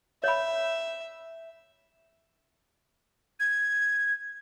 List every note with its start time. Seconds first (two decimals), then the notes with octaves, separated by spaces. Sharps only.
0.24 C#5 E5 B5
3.40 G#6